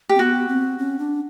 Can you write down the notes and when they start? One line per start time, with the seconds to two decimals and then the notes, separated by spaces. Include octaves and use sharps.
0.09 G4
0.15 C4
0.19 B3 F#4
0.48 C4
0.78 C#4
0.99 D4